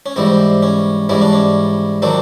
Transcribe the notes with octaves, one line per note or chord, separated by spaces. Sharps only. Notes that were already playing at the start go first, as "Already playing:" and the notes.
C#4
G#2 E3 G3 C4
C#4
G#2 E3 G3 C#4
D4
C#4
D#3 F#3 C4 D4